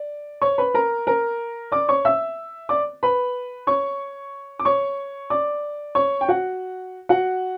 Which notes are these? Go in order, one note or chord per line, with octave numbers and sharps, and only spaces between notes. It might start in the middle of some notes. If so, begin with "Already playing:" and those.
Already playing: D5
C#5 C#6
B4 B5
A#4 A#5
A#4 A#5
D5 D6
C#5 C#6
E5 E6
D5 D6
B4 B5
C#5 C#6
D6
C#5 C#6
D5 D6
C#5 C#6
G5
F#4 F#5
F#4 F#5